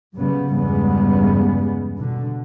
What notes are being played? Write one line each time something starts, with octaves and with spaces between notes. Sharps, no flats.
F#2 C#3 G3 B3
E2 G2 C#3 G3 G#3 B3
B2 D3